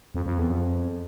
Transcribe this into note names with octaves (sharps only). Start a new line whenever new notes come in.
F2
F2
E2
F2